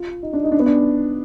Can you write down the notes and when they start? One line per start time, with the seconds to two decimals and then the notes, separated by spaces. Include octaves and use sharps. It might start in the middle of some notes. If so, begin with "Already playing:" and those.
Already playing: F4
0.23 D#4
0.33 D4
0.44 D#4
0.52 D4
0.59 B3
0.66 D4